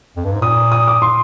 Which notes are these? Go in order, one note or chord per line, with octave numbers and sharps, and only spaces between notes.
F2
G2
G#2
A#2 D#6
D#6
D6
C6